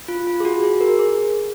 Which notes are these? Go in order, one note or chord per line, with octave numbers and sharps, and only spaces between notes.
F4
F4
G#4
F#4
G#4
A#4
G#4